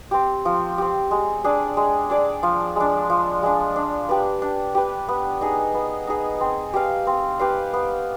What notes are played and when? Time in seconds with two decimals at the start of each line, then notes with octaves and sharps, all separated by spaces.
0.11 C4 G4
0.45 F3
0.78 C4 G4
1.11 G#3
1.44 D4 G#4 D5
1.77 G#3
2.10 D4 G#4 D5
2.43 F3
2.76 G#3 D4
3.10 F3
3.43 G#3 D4
3.76 D4
4.09 G4 B4
4.42 D4
4.75 G4 B4
5.09 B3
5.41 D#4 G#4
5.74 B3
6.07 D#4 G#4
6.41 C4
6.74 G4 B4 F5
7.07 C4
7.39 G4 B4 F5
7.74 B3